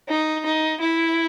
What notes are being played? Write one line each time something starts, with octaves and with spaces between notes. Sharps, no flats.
D#4
D#4
E4